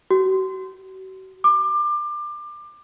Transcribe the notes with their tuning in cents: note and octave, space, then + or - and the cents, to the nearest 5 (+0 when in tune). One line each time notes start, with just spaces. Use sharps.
F#4 +40
D6 +25